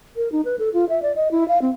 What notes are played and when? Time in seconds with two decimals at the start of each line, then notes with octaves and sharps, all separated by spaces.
0.16 A#4
0.32 D#4
0.45 B4
0.59 A4
0.74 F4
0.89 E5
1.02 D5
1.16 D#5
1.31 E4
1.48 F5
1.62 C4